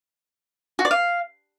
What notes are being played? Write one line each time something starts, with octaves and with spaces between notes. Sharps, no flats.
F#4
D5
F5